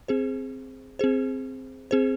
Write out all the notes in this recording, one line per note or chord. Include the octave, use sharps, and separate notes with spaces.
C4 G#4 C5
C4 G#4 C5
C4 G#4 C5